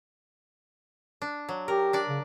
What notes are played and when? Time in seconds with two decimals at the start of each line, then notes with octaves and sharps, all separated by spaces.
1.22 D4
1.49 F#3
1.68 G4 A#4
1.93 D4 D5
2.09 C#3